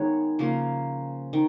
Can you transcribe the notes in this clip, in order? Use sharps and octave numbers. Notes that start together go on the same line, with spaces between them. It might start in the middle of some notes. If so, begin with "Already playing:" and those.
Already playing: D#3 G#3 B3 C#5
C#3 F3 A#3
D#3